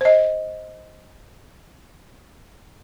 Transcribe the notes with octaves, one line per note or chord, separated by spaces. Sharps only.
C5 D#5